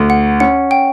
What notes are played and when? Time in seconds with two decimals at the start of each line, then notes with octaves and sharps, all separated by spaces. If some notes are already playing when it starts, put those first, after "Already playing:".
Already playing: D2
0.10 F#5
0.40 C#4 F#5
0.71 G5